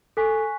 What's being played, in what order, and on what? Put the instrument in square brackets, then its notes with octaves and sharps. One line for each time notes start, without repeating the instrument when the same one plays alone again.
[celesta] A4 [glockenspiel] G#5 C#6 F#6 B6